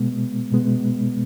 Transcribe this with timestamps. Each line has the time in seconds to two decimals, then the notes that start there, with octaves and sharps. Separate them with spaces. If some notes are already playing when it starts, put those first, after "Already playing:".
Already playing: B2 G#3 B3
0.52 B2 G#3 B3